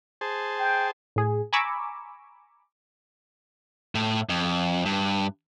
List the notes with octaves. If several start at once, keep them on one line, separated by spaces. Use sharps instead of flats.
G#4 C5 A5
G5
A2 G#4
G#5 A#5 B5 C#6 D6 E6
A2
F2
G2